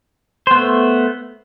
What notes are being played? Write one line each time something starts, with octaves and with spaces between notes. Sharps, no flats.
A3 B3 C5